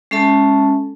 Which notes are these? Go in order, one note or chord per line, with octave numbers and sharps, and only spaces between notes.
G#3 C#4 A4 E5 A5